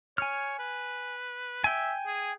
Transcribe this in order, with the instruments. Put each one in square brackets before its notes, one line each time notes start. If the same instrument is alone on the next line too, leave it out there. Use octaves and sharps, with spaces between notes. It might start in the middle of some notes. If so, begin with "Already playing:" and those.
[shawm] C#5 [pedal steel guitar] G#5 F6
[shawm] B4
[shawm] E5 [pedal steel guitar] G5 G#5
[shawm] G#4